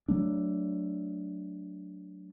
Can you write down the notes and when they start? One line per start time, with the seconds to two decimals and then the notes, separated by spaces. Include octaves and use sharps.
0.08 F#3 A3 D4